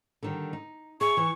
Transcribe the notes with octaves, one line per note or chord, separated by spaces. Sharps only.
D3 D#3 G3
D#4
G#4 E5 C#6
E3